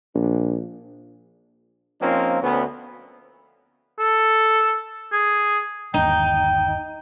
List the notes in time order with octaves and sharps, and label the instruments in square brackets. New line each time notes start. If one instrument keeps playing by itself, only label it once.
[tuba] A#1
[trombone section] F3 A#3 C4 C#4 D#4 F4
D2 B3 C#4
[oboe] A4
G#4
[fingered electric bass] G1 D#2 [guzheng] D#4 [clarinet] G5